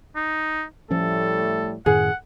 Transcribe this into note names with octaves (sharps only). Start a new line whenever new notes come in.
D#4
A2 F3 G3 A3 C#4 A4
F#2 A2 D#3 G#4 F#5